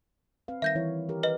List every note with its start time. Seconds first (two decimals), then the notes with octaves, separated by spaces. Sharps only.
0.48 C4 B4 F5
0.62 D#3 G3 A#4 E5 G6 A#6
0.75 E3 E4 C#5
1.09 G4 A#4
1.23 B4 D#5